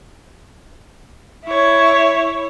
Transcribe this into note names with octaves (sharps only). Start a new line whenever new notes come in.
E4 C#5